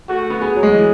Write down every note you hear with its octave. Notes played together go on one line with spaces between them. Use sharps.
A3 F#4
B3
B3 G#4
F#3
G#3
E3